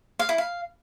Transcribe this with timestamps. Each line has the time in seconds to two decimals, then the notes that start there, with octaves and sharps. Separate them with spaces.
0.19 F5
0.29 E4
0.38 F5